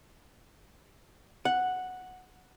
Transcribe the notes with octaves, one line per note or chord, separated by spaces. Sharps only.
F#5